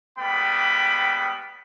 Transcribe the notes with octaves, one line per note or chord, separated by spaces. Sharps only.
G3 G#3 A#3 B3 G5 B5